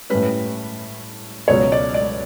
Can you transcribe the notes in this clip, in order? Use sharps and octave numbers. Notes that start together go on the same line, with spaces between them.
A2 G3 C#4 B4
C#2 B2 F#3 C#5
D5
D5